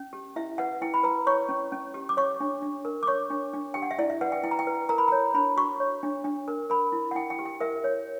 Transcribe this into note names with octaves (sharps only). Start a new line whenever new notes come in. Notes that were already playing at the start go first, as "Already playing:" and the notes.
Already playing: C#4
G4
E4 E5
B4 F#5
E4 G5
B5
B4 A#5
C#5 C#6
C#4
C#4
G4
D6
C#5 C#6
D4
D4
A#4
D6
C#5 C#6
D4
D4
G4 G5
F#5
E5
E4 D5
E5
B4 F#5
G5
E4 G5
A#5
G5
B4
A#4 A#5
B5
A#5
C#5
D4 B5
F#4 C#6
C#5
D4
D4
A#4
A#4 B5
E4
F#5
E4 G5
G5
G4
G5
A#4 E5
C#5